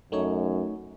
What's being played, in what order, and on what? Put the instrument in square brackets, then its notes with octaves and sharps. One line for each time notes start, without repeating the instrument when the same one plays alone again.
[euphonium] F#2 [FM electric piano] A3 D#4 C#5